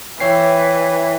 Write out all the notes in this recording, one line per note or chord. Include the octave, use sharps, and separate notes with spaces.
E3 C#5 G5 C7